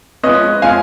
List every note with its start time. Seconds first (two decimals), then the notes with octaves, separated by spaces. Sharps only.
0.23 F3 G#3 C#4 B4 D#5
0.62 F3 G#3 C#4 F5 G#5